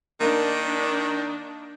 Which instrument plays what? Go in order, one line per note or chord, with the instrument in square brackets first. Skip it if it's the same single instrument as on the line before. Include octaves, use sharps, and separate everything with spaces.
[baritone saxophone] D#3 [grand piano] A#3 D#4 [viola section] D4